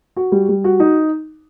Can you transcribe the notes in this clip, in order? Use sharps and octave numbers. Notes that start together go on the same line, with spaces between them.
F#4
G3
G3
F#4
D#4